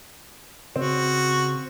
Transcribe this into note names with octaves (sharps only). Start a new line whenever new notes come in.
C#3 C4 F#4